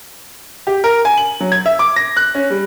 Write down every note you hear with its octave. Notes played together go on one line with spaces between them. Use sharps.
G4
A#4
G#5
F#7
F#3
G#6
E5
D6
A#6
F#6
C#4
G3